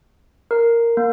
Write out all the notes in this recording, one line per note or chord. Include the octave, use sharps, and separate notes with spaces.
A#4
A#3